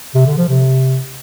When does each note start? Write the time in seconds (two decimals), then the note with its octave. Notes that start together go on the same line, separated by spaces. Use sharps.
0.15 C3
0.26 D3
0.37 F3
0.49 C3